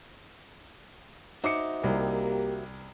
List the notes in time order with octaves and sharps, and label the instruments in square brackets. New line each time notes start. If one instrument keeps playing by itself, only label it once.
[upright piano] D#4 D6 C#7 [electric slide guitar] F#4 C5 E5
[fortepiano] C2 [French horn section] A#3 G4